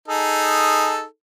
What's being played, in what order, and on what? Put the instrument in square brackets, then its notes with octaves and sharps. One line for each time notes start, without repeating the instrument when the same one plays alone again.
[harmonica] D#4 G#4 A4